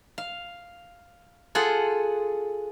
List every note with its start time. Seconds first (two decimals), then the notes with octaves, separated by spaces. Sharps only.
0.18 F5
1.55 F4 G#4 A4 F#5